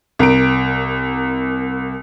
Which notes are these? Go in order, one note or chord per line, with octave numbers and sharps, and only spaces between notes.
C2 A#4 D7